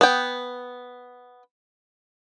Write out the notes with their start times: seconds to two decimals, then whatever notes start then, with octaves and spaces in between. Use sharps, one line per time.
0.01 B3 G5